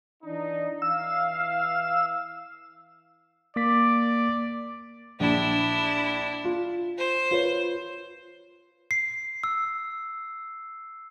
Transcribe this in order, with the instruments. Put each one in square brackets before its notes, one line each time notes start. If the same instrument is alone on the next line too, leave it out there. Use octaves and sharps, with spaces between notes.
[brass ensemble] E3 D4 D#4
[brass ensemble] E3 F5 [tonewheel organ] E6
[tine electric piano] A#3 D6 B6 [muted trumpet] D5
[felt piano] A#1 [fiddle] D4 E4
[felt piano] F4
[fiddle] C5
[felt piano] F4 B4 C#5
[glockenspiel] C7
E6